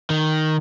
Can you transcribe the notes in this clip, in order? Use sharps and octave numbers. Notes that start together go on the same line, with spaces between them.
D#3